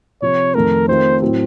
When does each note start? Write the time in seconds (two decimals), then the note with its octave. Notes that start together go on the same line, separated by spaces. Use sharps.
0.22 C3 F3 C4 C#5
0.55 F2 D#3 A3 A#4
0.88 D#3 A3 C4 F4 A#4 C5
1.22 A2 F#3 C4